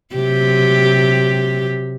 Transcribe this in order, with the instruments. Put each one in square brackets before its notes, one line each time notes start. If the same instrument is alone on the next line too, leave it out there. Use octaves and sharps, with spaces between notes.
[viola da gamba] C3 F#3 G4